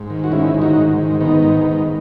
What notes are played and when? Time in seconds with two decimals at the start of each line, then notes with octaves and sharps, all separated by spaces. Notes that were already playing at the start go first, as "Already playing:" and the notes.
Already playing: G#2
0.10 D#3
0.24 F#4
0.32 G#2 C#4 E4
0.54 D#3
0.62 D#4 F#4
0.77 G#2
0.99 D#3
1.21 D#3 B3 D#4
1.43 G#2
1.65 D#3